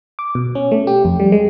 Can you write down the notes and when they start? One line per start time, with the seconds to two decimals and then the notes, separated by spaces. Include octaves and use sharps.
0.19 D6
0.35 B2
0.55 C#4
0.72 A3
0.87 G4
1.05 F2
1.20 G3
1.32 G#3